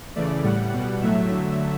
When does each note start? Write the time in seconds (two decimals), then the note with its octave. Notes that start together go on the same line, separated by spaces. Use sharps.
0.16 C#3 E3 A3 D5
0.44 A2 G3 F#5
0.73 B2 G3
1.01 A2 F#3 A3 E5
1.31 D3 F#3 A3